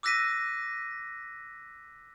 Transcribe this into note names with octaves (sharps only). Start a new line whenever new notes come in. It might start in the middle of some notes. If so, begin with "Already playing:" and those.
D6 E6 F#6 A#6 B6 D#7